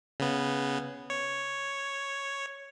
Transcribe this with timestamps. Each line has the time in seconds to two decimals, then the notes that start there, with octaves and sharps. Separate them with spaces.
0.20 C#3 B3
1.10 C#5